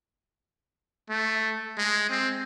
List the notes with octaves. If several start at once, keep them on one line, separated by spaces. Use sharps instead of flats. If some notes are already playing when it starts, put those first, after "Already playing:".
A3
G#3
C4